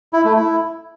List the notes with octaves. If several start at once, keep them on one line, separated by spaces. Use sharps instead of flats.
E4
A3
E4